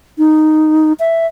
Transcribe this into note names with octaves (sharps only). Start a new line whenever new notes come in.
D#4
E5